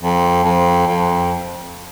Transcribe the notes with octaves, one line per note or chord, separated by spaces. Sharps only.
F2
F2
F2